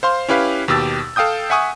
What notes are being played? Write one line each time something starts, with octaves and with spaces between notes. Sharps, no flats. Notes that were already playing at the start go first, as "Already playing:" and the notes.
C5 F5 C6
C#4 E4 G4 B4 F5
D#2 B2 G4 E6 A6
A4 F5 G5 D#6 G6
E5 F#5 G#5 C#6 D#6